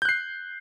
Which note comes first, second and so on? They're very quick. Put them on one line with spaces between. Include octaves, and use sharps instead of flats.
G6 F#6 C7